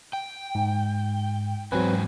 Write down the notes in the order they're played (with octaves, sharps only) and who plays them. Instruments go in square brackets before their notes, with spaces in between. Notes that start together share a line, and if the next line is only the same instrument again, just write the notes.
[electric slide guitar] G5
[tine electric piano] G#2
[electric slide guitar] E2 G#2 G#5 [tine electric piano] F#3 C4 B4